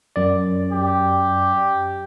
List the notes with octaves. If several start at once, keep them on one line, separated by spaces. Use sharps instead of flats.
F#2 D5
G4